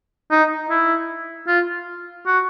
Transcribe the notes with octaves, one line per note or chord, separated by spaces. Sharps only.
D#4
E4
F4
F#4